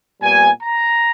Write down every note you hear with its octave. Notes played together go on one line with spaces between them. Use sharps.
A#2 G3 B3 G#5
A#5